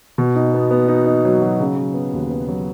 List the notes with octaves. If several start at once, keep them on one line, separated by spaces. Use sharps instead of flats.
B2
D#4
B3
B3
D#4
D#4
F#3
F#3
C#3
F#3
B3
D#2
B3
F#3